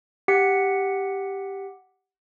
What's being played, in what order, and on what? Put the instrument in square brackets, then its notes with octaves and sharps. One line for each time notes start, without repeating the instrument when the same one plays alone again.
[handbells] G4 F#5 B6 C#7